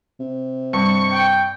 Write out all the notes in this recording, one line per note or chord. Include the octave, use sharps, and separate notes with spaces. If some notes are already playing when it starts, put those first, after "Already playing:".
C3
G2 C#6
G5